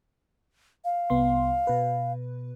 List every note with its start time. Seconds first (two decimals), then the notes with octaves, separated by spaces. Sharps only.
0.84 F5
1.10 C2 B3 C6
1.67 B2 B4